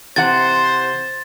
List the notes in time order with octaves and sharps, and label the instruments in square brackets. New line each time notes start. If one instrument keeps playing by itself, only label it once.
[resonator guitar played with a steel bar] C3 E3 F#5 [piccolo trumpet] C5 [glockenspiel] A6